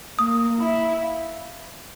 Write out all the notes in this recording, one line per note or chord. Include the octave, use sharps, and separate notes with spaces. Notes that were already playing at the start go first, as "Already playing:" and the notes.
A#3 D#6
E4 B5
F5